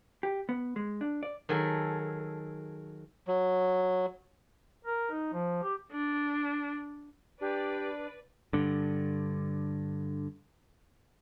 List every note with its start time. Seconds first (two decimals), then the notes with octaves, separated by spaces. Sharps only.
0.23 G4
0.49 B3
0.76 G#3
1.01 D4
1.23 D5
1.49 D#3 F#3 G#4 A4
3.27 F#3
4.85 A#4
5.11 D#4
5.33 F3
5.63 G4
5.92 D4
7.41 D4 G4 B4 D5
8.53 G2 D3